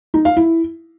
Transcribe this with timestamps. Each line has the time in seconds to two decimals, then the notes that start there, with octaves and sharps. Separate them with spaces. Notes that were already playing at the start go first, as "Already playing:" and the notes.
0.14 D#4
0.25 F5
0.37 E4